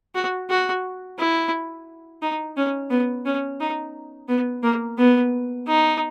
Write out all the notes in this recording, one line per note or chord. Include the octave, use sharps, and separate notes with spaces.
F#4
F#4
E4
D#4
C#4
B3
C#4
D#4
B3
A#3
B3
D#4